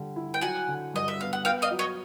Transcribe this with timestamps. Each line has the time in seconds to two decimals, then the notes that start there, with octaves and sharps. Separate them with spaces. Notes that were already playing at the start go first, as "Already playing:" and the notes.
Already playing: D3 G3
0.16 E4
0.34 G5
0.41 F#3 F#5 G#5
0.68 D3
0.94 G2 D#5
1.08 E5
1.19 B3 F5
1.33 F#5
1.45 B3 F5 G5
1.62 D#5 F5
1.71 F#3
1.79 C#5 D#5